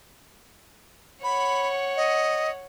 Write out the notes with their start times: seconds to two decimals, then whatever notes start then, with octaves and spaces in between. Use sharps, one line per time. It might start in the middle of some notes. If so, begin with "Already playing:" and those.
1.24 C#5 F#5 B5
1.97 D#5